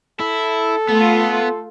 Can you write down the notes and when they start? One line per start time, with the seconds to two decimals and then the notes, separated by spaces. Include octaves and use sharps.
0.20 E4 A4
0.88 A3 B3 F4